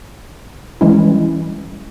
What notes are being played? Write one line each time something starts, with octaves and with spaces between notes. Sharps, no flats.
E3 G3 G#3 C#4 E4